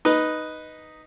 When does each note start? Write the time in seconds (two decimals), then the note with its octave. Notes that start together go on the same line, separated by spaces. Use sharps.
0.05 D#4 B4